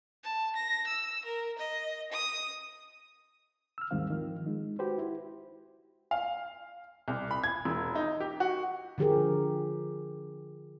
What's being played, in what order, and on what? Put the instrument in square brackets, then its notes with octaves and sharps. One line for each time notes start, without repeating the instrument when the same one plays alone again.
[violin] A5
A#6
E6
A#4
D#5
D#6
[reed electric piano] E6 F6
D#2 G#2 D#3 G3 C4 F5
D#3 F3
G#3 D#4
F#4 G4 B4 C5
E4
[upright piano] F5
C2
B5
G#6
E1
D#4
G4
F#4
[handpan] D3 F3 G4 G#4 A#4